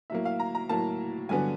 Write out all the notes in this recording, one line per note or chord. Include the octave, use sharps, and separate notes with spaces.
A2 F#3 A#3 E5
F5
A#5
A#5
A2 F#3 A#3 A5
G2 D3 F#3 B3 G#5